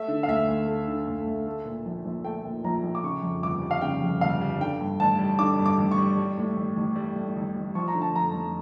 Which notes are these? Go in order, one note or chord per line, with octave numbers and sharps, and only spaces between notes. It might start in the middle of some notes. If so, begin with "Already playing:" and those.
Already playing: A3 E5
D3
F5
D2 E5
D2
A3
D3
D2
D2
A3
A#2
A#1
A#1
A3 G5
A#2
A#1 A#5
A#1
D6
C#3 C#6
F2
G1 D6
G3
F5
C#3 G5
F2
G1 F5
G3
D3 G5
G2
A1 A5
G3
D3 D6
G2
D6
A1
C#6
G3
G3
A2
A1
A1
G3
A2
A1
A1
F3 C#6
A#5
D3
A5
F2 A#5
F2